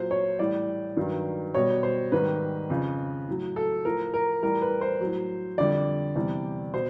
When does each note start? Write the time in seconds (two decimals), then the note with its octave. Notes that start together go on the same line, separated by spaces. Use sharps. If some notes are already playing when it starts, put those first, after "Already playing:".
Already playing: A#2 F#3 C5
0.11 C#5
0.39 A2 E3 G3 D5
0.97 G2 D#3 F#3
1.54 B2 G3 C#5
1.83 C5
2.12 G#2 D#3 G3 B4
2.70 F2 C#3 F3
3.28 A2 F#3
3.56 A4
3.85 A2 F3 A#4
4.14 A#4
4.43 A2 E3 G3 A#4
4.62 B4
4.81 C5
5.01 A2 F#3
5.58 F2 D3 G3 D5
6.15 E2 C3 E3 G3
6.73 B2 C5